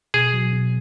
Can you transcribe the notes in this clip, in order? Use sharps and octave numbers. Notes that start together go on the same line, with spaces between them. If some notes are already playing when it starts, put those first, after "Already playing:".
B2 G#4
F#3
B2